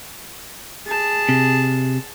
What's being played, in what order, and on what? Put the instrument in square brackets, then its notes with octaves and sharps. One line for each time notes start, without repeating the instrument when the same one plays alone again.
[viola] G#4 A5
[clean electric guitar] C3